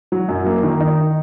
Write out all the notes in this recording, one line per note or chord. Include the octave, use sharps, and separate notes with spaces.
F#3
F#2
A#3
D#3
D#4